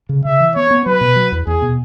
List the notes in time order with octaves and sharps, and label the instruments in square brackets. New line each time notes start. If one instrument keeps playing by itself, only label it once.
[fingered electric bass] C#3
[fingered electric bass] C#3 [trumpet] E5
[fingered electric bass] E3
[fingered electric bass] B3 [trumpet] C#5
[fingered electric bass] B3
[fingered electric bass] F#3 [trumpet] B4
[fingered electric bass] B2
F#3
E2
[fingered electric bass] E2 [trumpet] G#4
[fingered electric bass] B2